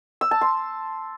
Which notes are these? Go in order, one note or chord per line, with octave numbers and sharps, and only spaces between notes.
E6
A5
C6